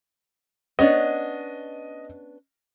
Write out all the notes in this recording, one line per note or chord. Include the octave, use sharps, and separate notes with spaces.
B3 C#4 D4 D#5